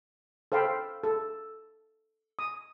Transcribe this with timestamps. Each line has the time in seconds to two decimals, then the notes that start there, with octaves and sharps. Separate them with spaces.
0.52 A4 C5 F5 G5 B5
1.04 A4
2.39 D#6